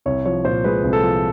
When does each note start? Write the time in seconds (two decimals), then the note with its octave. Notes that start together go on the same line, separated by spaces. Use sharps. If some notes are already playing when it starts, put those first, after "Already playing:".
0.06 C2 C#5
0.25 F3 C#5
0.44 A#2 C5
0.64 G#3 B4
0.83 C2
0.93 A4
1.03 F3